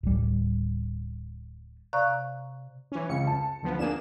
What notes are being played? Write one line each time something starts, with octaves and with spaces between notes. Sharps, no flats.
D1 G3
C3 D5 F5 A#5 C#6 F#6
E3 C#4
C#2 C#3 C#7
A5
D2 F3 B3
A#3 D4 G#4 E7